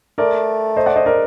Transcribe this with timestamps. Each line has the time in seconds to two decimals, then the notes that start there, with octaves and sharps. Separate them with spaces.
0.18 A3 A#4 D5
0.76 C5 D#5
0.86 D5 F#5
0.96 C5 D#5
1.05 A#4 D5